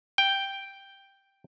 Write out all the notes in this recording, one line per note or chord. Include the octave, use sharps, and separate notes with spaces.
G5